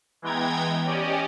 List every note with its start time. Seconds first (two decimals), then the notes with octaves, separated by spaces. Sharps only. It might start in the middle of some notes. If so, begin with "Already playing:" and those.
0.22 E3 G#3 B3 G5 A#5 G#6
0.85 C#4 G4 D5 D#5